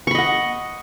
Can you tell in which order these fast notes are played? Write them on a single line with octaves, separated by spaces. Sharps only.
C#6 B5 D#5 F#5